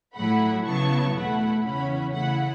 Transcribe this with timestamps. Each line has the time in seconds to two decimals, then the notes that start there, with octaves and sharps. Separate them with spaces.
0.17 A2 F#3 A3 E4 F#5 B5
0.66 C#3 F#3 B3 E4 A5 C#6
1.15 E2 B2 A3 E4 F#5 B5
1.65 E2 C#3 E3 C#4 E4 F#5 B5
2.13 C#3 A3 E4 F#5 B5